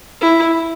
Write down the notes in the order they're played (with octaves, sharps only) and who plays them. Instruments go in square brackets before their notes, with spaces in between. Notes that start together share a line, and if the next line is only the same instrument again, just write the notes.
[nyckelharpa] E4